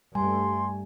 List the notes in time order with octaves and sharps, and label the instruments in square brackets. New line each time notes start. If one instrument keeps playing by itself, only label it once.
[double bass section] G2 A3 [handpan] G3 [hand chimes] G#5 [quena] C6